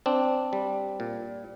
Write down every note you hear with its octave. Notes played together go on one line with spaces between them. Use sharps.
C4 D4
G3
A#2